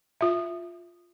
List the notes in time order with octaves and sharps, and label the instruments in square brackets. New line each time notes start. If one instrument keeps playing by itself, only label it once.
[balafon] F4 E5